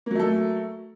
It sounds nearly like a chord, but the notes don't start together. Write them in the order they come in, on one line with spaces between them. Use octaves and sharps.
A#3 F#3 A3 A4